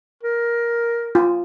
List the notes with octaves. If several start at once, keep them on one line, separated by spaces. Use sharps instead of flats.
A#4
F4